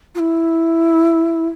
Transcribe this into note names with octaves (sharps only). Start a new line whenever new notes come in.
F4
E4